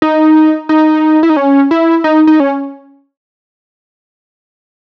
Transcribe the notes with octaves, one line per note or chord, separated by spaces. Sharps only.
D#4
D#4
E4
D#4
C#4
E4
D#4
D#4
C#4